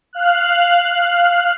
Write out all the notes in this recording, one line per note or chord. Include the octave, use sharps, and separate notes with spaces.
F5 F6 F#6